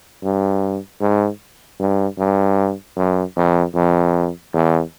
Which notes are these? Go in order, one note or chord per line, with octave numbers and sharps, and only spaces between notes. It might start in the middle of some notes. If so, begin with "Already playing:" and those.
G2
G#2
G2
G2
F#2
F2
F2
E2